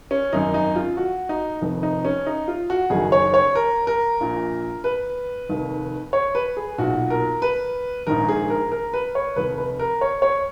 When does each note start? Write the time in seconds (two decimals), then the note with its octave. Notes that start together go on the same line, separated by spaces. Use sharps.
0.11 C#4
0.33 G#1 F#2 D#3 D#4
0.54 D#4
0.76 F4
0.97 F#4
1.29 D#4
1.61 F1 F2 D#3
1.83 D#4
2.05 C#4
2.27 D#4
2.48 F4
2.70 F#4
2.90 F#1 F#2 D#3 G#4
3.12 C#5
3.34 C#5
3.55 A#4
3.87 A#4
4.20 A#1 A#2
4.84 B4
5.49 F1 D#2 D#3
6.13 C#5
6.35 B4
6.57 G#4
6.78 B1 A#2 F#4
7.10 A#4
7.42 B4
8.07 A#1 G#2 D#3 A#4
8.29 G#4
8.50 A#4
8.72 A#4
8.93 B4
9.15 C#5
9.36 F1 D#2 D#3 B4
9.58 B4
9.79 A#4
10.01 C#5
10.22 C#5